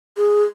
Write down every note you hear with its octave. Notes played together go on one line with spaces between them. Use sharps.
G#4